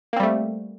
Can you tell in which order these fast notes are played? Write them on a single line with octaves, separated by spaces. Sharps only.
A#3 C4 G3 A3